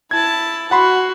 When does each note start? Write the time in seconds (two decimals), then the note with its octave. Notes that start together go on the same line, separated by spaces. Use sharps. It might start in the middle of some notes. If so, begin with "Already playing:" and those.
0.11 E4 A5 G#6
0.71 F#4 F#5 B5 C6